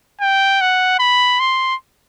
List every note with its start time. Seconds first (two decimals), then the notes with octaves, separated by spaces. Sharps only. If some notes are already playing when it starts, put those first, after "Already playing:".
0.21 G5
0.61 F#5
0.99 B5
1.40 C6